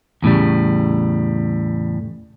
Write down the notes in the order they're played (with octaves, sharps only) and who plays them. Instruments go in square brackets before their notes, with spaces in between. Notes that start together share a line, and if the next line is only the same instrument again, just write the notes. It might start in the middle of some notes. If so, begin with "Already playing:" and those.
[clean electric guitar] E2 A2 C#3 G3